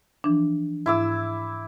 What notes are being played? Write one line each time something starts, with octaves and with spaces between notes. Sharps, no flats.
E3 F3 D4
G#2 E4 D6 E6